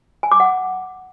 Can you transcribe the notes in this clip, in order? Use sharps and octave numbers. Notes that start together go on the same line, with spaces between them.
G#5
D6
F#5